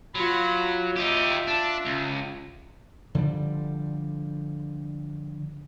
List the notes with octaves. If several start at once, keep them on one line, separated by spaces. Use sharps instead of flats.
F#3 F4 B5
D#4 F4 G4 E5
D4
C#2
D3 F3 G3